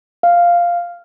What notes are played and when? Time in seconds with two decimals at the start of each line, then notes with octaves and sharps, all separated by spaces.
0.23 F5